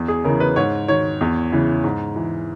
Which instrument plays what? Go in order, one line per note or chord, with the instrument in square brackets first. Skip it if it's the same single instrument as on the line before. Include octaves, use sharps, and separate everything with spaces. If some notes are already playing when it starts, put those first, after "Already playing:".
Already playing: [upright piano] E2
G#4
C#3 A#4
E3
B4
G#2 C#5
D#3 C#5
E2
C#3 E3
G#2
E3